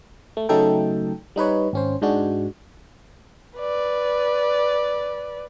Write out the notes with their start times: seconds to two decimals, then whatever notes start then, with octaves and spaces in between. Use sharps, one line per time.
0.37 A3
0.49 C#3 F#3 A3 D#4 A4 G5
1.36 G3 D#4 B4 C#5
1.73 G#1 C#4 C5
2.02 G#2 G#3 D4 F#4
3.58 B4 D5